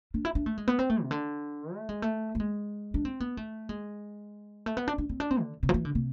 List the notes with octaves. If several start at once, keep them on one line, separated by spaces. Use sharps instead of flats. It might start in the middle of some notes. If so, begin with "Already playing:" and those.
D4
E4
D4
A3
G#3
B3
C4
A3
C3
D3
A3
G#3
A3
A3
G#3
D4
C4
B3
A3
G#3
A3
B3
D4
D4
C4
D4
C4
D3
C3
F3
E3
D3
C3